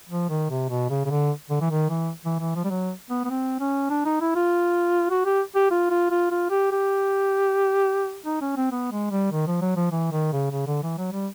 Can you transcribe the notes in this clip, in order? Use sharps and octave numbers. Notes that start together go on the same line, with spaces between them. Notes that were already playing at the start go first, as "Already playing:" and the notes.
F3
D#3
C3
B2
C#3
C#3
D3
D3
E3
D#3
E3
E3
E3
F3
G3
F#3
B3
B3
C4
C#4
D4
D#4
E4
F4
F#4
G4
G4
F4
F4
F4
F4
G4
G4
D#4
C#4
C4
B3
G#3
G3
D#3
F3
F#3
F3
E3
D#3
C#3
C#3
D3
E3
F#3
G3